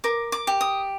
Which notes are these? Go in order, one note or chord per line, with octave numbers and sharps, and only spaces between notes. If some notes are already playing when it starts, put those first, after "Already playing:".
A#4 D6
D6
G4
D#6